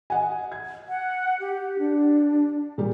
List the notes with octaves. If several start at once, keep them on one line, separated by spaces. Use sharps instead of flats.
D#5 F#5 G#5
G#6
F#5
G4
D4
A#2 G3 G4